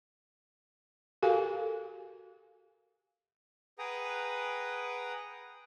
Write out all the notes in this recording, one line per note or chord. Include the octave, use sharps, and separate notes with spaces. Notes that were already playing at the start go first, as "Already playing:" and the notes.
F#4 G4 A4 A#4 F5 G#5
G#4 B4 F#5 G5 A#5 D#6